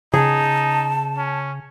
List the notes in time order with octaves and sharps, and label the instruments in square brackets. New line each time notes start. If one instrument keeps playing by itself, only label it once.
[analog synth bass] C#3 [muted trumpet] D#4 [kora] G#4 [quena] A5
[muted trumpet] C#4